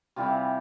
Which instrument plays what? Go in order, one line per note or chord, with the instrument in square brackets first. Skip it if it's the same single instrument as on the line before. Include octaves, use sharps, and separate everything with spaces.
[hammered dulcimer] C3 E3 G3 C4 F4